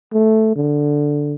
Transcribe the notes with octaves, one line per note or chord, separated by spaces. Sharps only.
A3
D3